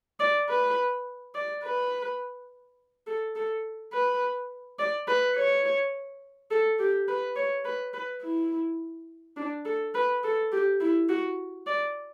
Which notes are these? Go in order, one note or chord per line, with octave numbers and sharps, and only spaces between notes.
D5
B4
D5
B4
A4
A4
B4
D5
B4
C#5
A4
G4
B4
C#5
B4
B4
E4
D4
A4
B4
A4
G4
E4
F#4
D5